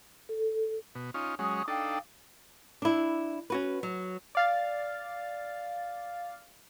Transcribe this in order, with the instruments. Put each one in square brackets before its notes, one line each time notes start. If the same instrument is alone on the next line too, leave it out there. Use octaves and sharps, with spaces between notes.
[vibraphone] A4
[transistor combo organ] B2
C#4 D#4 F4
[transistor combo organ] F#3 G#3 C#4 [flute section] C#6 D#6
[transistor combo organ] D4 D#4 A4 [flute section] F5 G5
[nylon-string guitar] D4 E4
C#4 F#4 B4
F#3
[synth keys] D5 F5 A6